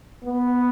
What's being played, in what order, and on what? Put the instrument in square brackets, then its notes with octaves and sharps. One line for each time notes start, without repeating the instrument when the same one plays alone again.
[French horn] B3